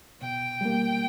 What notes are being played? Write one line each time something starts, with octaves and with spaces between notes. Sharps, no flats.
B2 G5
G3 A#3